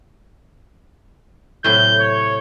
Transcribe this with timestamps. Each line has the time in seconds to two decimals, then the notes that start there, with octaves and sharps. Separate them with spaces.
1.64 A2 C3 F#3 G6
2.01 C#5